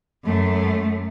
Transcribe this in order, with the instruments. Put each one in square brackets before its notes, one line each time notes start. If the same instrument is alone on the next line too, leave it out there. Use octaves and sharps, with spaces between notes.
[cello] F#2 A3